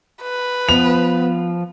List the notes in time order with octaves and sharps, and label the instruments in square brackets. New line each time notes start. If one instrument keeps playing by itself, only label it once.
[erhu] B4
[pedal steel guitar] F3 [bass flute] B3 [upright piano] F7